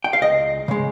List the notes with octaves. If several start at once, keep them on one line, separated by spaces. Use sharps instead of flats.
G5
F5
C#2 D#5
C#3 G#3